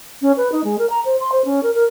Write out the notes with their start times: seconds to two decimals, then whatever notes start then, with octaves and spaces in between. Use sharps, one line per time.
0.21 C#4
0.37 B4
0.52 D#4
0.64 G#3
0.78 A#4
0.90 A#5
1.05 C5
1.20 C6
1.32 C5
1.45 C#4
1.63 A#4
1.74 A#4